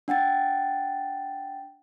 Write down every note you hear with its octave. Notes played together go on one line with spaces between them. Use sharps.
D4 F#5 G5 A6